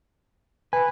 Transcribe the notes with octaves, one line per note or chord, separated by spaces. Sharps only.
B4 G#5